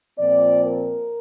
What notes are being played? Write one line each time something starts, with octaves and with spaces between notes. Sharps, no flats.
A#2 F3 C4 D5
A#4